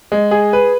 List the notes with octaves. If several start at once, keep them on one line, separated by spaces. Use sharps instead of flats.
G#3
G#4
B4